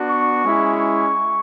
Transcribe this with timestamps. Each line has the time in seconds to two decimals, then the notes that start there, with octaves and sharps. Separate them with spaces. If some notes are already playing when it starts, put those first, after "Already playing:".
Already playing: B3 D4 F#4
0.09 C#6
0.44 G#3 C#4 E4
0.79 C#6